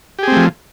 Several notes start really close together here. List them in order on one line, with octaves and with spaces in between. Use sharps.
G4 G#4 C4 A3 F3